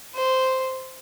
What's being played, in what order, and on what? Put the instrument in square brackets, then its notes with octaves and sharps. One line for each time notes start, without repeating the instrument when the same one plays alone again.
[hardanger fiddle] C5